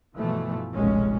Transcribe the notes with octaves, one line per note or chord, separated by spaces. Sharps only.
G2 B2 E3 F3 A3
F1 B1 A#2 G#3 C#4